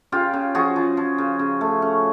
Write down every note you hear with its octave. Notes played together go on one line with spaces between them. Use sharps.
C#3 F4 G4
C#3
F3 F#4 G#4
F3
F3
C#3
C#3
A3
C#4